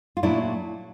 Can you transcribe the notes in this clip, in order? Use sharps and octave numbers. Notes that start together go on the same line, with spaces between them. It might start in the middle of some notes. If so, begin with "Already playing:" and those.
F4
A#2 F#3 A3 D4 E4